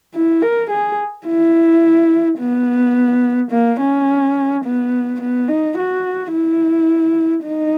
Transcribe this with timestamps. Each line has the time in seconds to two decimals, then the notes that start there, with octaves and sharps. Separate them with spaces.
0.14 E4
0.42 A#4
0.70 G#4
1.27 E4
2.39 B3
3.51 A#3
3.80 C#4
4.65 B3
5.21 B3
5.48 D#4
5.78 F#4
6.33 E4
7.46 D#4